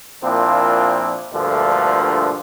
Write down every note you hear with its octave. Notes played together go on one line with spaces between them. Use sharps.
A#2 F3 A#3 C4 D4 E4
D2 G2 A#2 D3 F3 A3